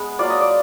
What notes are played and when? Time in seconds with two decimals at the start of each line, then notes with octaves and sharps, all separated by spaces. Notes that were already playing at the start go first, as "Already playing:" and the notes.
Already playing: G#3 B3
0.19 F#3 A#3 F4 D5
0.30 D#5
0.41 D5